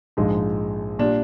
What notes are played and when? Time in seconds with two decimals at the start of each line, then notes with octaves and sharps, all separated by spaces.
0.17 A#1 G#2 F3 G#3 D#4
0.99 A#2 G3 D4